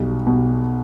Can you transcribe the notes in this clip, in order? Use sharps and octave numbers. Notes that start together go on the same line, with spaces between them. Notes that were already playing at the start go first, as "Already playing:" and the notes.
Already playing: B1 B2 G3
B2 G3